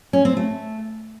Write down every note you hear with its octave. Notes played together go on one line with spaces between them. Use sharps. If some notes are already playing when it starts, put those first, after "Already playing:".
C#4
C4
A3